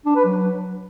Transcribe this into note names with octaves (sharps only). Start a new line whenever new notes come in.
D4
B4
F#3